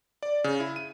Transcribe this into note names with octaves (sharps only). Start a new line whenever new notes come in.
D5
C#3
E4
D#7